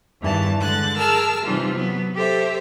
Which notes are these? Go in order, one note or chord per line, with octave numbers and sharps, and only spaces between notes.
E2 G2 D#3 E3 A5
D3 G#3 F#6 A6
G#4 A#4 A5 E6 F6
C3 E3 G3 D#4 F4
F#3 B3
G4 A4 C5 E5